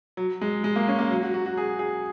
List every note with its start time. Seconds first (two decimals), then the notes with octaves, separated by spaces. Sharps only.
0.17 F#3
0.41 G#3
0.64 G#3
0.76 A#3
0.88 C#4
0.99 A#3
1.10 F#3
1.22 F#4
1.34 F#4
1.46 F#4
1.57 G#4
1.79 G#4